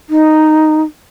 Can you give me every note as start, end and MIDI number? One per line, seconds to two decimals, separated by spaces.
0.09 0.82 63